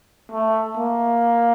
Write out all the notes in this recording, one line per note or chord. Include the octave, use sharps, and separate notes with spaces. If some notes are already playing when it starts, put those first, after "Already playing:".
A3
A#3